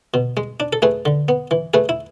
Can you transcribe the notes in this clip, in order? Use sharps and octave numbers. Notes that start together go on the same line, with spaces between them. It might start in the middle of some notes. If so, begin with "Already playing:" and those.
B2
G#3
D4
A4
A3 G#4 B4
D3
B3
E3
A3 G#4 B4
E4